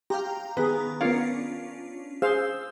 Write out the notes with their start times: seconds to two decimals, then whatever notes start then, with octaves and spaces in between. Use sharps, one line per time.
0.10 G4 F5 G5 A#5
0.57 D#3 B3 G#4 B4 A#5
1.01 B3 C#4 D4 F4 A#4 F5
2.22 G#4 C5 F5 E6